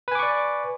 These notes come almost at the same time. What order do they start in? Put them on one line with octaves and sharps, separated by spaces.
B4 G#5 D6 C#6 D5